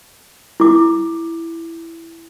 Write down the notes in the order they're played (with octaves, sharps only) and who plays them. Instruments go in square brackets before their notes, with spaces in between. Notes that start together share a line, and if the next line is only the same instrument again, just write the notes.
[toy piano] E4 D6